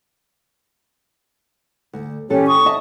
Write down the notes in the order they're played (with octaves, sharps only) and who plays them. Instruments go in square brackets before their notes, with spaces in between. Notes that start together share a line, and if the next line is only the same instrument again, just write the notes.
[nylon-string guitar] D2
[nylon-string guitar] A#2 E3 A4 [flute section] C#4 G4 C#5
[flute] C#6 [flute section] D#6
[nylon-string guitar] D#5 E5 A5